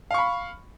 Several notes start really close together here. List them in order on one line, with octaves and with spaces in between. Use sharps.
F5 C#6 B5